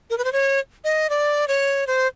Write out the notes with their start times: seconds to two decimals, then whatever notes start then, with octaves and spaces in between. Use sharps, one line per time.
0.10 A#4
0.18 B4
0.25 C5
0.33 C#5
0.84 D#5
1.10 D5
1.48 C#5
1.87 C5